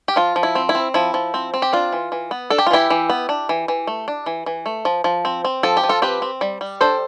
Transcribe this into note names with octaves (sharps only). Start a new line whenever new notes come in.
G4
F3 F4
F3
E4
C4
E4
C4
F3 E4
F3
C4
C4
G4
D4 F4
E3
E3
B3
D4 A4
G4
F4
E3 E4 G4
E3
B3
D4
E3
E3
A3
D4
E3
E3
A3
F3
F3
C4
C4
F3 A4
G4
F3
F4 A4
C4 G4 B4
C4
G3
G3
D4 A4 C5